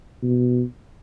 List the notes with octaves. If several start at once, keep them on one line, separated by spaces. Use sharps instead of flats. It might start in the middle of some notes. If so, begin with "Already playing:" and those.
B2